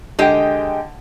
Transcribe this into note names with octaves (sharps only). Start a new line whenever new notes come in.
D3 G#3 G4 D#5 G5